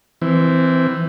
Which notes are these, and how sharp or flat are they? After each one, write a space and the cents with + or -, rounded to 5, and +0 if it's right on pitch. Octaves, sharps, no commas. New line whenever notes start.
E3 +0 C4 -15